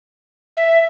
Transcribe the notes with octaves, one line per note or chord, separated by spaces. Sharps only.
E5